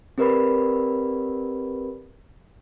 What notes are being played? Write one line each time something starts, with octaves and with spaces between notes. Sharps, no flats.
C4 G4 A#4 B4 D5 B5